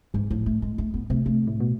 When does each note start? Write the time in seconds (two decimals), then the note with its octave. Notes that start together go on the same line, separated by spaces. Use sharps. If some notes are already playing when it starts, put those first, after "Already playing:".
0.14 G#2 E3
0.30 A2 F3
0.46 A3
0.62 G#3
0.78 A3
0.94 B3
1.10 C3 A3
1.26 A3
1.47 A2
1.60 B2